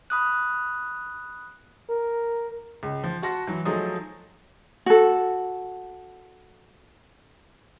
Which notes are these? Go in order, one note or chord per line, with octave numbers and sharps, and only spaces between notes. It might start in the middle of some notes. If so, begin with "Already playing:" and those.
B5 D#6 F#6
A#4
C#2
F3
F#4 F#5 A5 C6 A#6
E3 F#3
F3 F#3 A3 D#4 G#4 D#6
F#4 A4